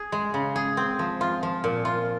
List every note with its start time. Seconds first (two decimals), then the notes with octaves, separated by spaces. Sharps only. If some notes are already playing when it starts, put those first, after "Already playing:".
Already playing: G#4
0.12 G#3
0.34 C#3
0.56 G#4
0.77 C4
0.99 F3
1.21 F4
1.43 F3
1.64 A#2
1.85 F4